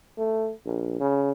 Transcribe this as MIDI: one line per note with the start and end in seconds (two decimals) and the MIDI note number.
0.18 0.51 57
0.66 0.98 34
1.00 1.32 49